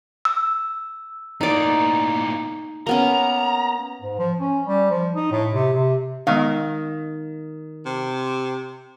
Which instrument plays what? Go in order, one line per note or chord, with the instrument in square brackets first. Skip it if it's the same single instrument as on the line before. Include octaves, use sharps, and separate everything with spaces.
[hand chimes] E6
[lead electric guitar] A2 A#3 [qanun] D#4 D5
[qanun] A#3 B3 C#4 [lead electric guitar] A#5
[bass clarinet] G#2
F3
C#4
G3
F3
D#4
A2
C3
C3
[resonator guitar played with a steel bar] D#3 [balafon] G#3 B3 C#6 [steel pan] F5
[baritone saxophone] C3